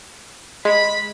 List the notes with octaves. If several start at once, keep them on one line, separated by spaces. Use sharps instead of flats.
G#3 B5